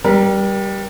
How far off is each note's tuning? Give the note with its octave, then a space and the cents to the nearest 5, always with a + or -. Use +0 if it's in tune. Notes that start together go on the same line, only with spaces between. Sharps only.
G3 +0 A#4 +40